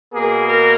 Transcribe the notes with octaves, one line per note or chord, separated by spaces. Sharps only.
B2 A#3 G#4
A#4